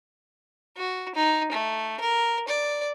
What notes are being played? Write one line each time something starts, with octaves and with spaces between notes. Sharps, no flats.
F#4
D#4
A3
A#4
D5